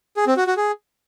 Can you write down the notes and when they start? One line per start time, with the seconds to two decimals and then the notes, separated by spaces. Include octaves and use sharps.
0.17 G#4
0.27 C4
0.37 F#4
0.47 F#4
0.57 G#4